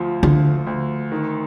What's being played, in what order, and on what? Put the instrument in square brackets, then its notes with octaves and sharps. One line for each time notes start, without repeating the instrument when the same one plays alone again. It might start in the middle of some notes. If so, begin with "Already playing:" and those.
Already playing: [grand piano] D2 F3
[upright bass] D3 [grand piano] F3
[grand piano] D2
D#3